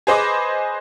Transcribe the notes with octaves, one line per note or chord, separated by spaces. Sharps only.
G#4 B4 C5 D#5 B5 D6